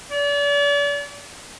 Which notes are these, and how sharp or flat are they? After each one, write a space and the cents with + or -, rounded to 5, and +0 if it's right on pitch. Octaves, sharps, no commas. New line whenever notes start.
D5 -40